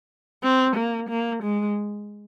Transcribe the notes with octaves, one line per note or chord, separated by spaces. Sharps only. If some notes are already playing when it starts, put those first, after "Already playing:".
C4
A#3
A#3
G#3